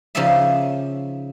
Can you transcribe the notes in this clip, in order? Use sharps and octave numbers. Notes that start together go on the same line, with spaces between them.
C#3 F3 D#4 G#4 D5 E5